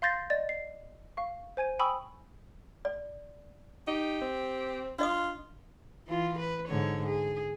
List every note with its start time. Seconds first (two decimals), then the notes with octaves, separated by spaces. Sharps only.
0.02 F5 C6 G6 A6 A#6 C7
0.30 D5 D#5 A6
0.49 C7
1.17 F5 C#6
1.57 C5 G#5 G#6 D#7
1.79 G5 G#5 B5 C#6 D#6 E6
2.85 D5
3.88 D#4 G4
4.22 C4
4.99 D4 F4 D#5 D#6
6.07 E3 F4
6.39 B4
6.68 G#2 D3 C#5
7.06 G#4